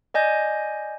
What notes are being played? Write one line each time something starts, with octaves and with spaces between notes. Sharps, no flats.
D5 D#5 G#5 G6 A#6